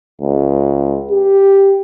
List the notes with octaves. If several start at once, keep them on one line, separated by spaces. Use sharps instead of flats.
C#2
G4